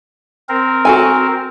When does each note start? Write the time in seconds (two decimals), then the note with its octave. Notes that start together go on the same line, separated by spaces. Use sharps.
0.49 C4 A#4
0.85 F#4 A4 G#5